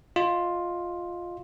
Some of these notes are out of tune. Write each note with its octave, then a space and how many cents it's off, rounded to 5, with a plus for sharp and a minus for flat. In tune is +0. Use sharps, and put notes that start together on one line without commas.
F4 +5 D#5 +0